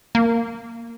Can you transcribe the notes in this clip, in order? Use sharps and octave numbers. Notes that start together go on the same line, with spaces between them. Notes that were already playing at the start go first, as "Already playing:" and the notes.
A#3